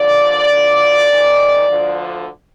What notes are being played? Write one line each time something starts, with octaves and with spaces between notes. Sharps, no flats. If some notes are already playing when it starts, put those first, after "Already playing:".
Already playing: D#2 D3 F3 D5
D2 D3 F3
G#2 D#3
D2 D3 F3